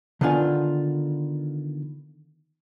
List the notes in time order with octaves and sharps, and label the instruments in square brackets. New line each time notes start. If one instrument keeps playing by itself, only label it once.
[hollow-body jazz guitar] D3 D#3 B3 D4 F4 G#5